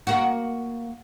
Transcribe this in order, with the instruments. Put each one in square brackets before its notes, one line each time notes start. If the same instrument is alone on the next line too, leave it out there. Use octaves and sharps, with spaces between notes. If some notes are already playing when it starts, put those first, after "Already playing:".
[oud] A#3 F#4